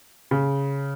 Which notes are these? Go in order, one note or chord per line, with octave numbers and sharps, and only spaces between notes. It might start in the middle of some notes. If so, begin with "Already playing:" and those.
C#3